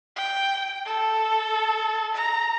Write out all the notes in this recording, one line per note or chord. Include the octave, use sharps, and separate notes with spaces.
G5
A4
A#5